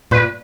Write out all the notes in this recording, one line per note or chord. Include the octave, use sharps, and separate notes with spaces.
A#2 B4